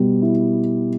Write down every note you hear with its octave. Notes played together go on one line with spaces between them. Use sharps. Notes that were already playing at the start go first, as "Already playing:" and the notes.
Already playing: B2 G3
E4